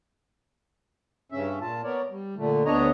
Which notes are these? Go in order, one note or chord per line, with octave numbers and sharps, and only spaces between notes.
G2 C#3 C#4 E5
A#2 F4 A5
B3 A#4 C#5 D5
G3
A#2 D3 A3
D2 B3 D4 C#5 D#5 A#5